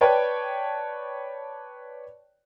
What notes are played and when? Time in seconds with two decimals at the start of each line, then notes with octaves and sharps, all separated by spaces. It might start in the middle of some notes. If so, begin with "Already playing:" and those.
0.01 B4 C#5 D5 G5 A5